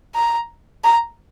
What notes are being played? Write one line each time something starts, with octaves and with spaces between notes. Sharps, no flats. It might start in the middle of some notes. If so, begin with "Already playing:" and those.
A#5
A#5